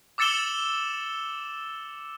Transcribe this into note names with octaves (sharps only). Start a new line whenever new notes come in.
D6 E6 A6 C#7 E7 G7